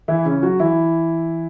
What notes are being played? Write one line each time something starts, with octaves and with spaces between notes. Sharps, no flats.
E3 E4
C#3 C#4
F#3 F#4
E3 E4